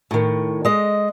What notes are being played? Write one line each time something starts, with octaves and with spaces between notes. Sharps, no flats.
A2 D#3
G#3 D#5